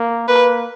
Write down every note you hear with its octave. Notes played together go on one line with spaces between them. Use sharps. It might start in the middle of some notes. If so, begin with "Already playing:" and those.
Already playing: A#3
A#3 B4